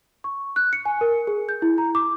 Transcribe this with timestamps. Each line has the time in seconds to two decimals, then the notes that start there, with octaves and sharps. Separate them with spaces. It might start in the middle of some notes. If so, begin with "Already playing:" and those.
0.24 C#6
0.56 F#6
0.73 C#7
0.85 G#5
1.01 A#4
1.27 G#4
1.49 G6
1.62 E4
1.78 A#5
1.95 D6